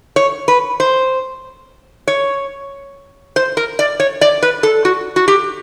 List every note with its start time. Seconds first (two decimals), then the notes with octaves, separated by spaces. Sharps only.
0.16 C#5
0.48 B4
0.80 C5
2.08 C#5
3.36 C5
3.57 A#4
3.79 D5
4.00 C#5
4.21 D5
4.43 B4
4.63 A4
4.85 F#4
5.16 F#4
5.28 G4